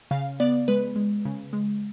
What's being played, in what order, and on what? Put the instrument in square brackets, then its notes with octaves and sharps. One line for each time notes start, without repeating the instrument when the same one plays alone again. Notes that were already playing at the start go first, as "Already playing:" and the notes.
[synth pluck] C#3 F5
B3 D5
G#3 B4
G#3
C#3
G#3